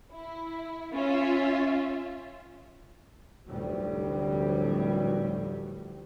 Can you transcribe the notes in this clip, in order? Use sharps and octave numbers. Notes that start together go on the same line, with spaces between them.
E4
C#4 F4 E5
F1 D2 A2 F#3 G3